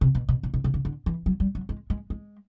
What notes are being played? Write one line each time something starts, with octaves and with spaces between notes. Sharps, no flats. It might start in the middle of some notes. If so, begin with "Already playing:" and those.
C3
B2
B2
A#2
B2
C3
C#3
D3
E3
F#3
G3
F#3
G#3
G#3
G#3